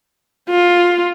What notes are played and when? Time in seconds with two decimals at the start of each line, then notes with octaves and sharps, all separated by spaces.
0.50 F4